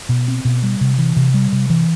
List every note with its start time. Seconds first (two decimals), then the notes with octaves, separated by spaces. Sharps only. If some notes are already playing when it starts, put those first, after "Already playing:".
0.09 B2
0.28 C4
0.45 B2
0.63 G3
0.81 C3
0.98 E3
1.16 C3
1.34 G3
1.52 C3
1.70 E3